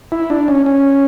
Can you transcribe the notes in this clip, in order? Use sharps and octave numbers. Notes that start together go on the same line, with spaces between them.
E4
D4
C#4
C#4